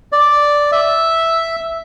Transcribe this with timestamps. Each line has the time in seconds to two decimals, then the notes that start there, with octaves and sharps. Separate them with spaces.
0.13 D5
0.72 E5